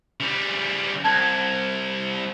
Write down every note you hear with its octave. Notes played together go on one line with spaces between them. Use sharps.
C#3 G3
C2 A5 G#6